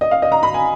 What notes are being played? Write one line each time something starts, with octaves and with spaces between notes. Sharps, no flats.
D#5
F5
D#5
A#5
B5
G#5